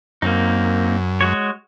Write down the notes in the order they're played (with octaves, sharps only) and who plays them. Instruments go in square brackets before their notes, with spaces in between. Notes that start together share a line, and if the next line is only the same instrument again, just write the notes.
[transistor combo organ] F#2 [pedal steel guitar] A#3 C4 D#4
[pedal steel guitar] G#3 F#4 C#5